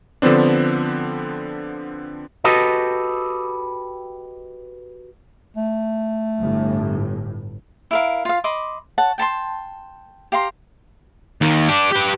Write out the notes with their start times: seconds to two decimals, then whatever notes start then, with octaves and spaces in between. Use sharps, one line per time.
0.22 D3 F3 B3 C4 D4
2.44 F#4 G4 A4 B4 D#5
5.57 A3
6.42 G1 A2
7.91 E4 A#4 F5
8.25 F4 F5
8.44 D#5 B5 C6 D6
8.98 C#5 F#5 A5
9.18 G5 A5 B5 C6
10.32 G4 F5 A#5 C6
11.41 D#2 D#3
11.69 D4 G4
11.92 G4 B4